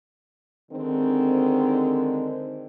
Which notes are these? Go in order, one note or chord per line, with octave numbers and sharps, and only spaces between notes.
D3 D#3 G#3 C4